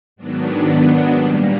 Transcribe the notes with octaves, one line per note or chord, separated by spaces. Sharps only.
G#2 D#3 F#3 B3 D4
A#2 G3 A#3